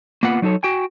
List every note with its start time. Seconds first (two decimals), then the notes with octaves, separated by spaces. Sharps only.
0.23 A#3 B3 F4 B4 F#5
0.42 F#3 D#4 F4 A4 C#5
0.63 F#4 G5 G#5